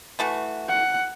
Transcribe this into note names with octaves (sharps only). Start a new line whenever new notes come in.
E3 A3 F#4
F#5